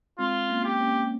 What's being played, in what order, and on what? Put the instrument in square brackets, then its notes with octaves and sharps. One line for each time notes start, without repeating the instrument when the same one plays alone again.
[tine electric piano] G#3 C4 [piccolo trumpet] F4
[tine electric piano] A#3 C#4
[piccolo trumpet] G4
[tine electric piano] A#3 C#4